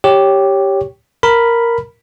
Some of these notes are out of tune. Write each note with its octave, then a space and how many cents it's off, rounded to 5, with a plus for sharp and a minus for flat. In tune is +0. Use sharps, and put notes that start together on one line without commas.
G4 +0 C#5 +0
A#4 +0 B5 +0